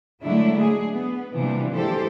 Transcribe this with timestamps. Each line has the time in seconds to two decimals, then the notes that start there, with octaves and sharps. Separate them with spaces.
0.22 D3 F#3 G#3 A3 D4 E4
0.60 G#4
0.93 B3
1.35 C3 E3 F3 G3 A#3 D4
1.74 E3 G#3 G4 A4 C5